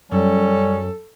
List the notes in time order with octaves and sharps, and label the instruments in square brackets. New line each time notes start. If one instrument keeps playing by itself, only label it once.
[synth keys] F#2 [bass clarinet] G3 [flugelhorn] C#4 [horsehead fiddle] A4